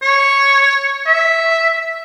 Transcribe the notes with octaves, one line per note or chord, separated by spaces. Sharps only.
C#5
E5